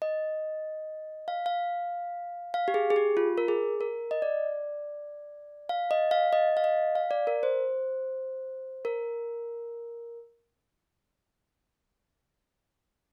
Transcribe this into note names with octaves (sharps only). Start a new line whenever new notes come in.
D#5
F5
F5
F5
G4
G#4
G#4
G4
F4
A#4
G#4
A#4
D#5
D5
F5
D#5
F5
D#5
F5
D#5
F5
D5
A#4
C5
A#4